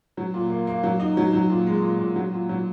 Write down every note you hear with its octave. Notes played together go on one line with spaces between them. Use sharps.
F#3
A#2
A#3
A#3
F#3
D#4
F#3
F#3
A#2
G#3
A#2
A#2
F#3
A#2
F#3